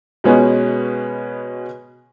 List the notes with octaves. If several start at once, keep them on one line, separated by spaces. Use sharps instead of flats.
B2 G#3 B3 C#4